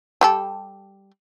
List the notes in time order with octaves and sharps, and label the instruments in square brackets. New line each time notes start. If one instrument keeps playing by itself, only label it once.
[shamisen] G3 G4 A4